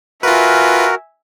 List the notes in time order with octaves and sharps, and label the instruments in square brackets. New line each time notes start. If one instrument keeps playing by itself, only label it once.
[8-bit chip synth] F4 B4 [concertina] F#4 A#4 [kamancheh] E5 G#5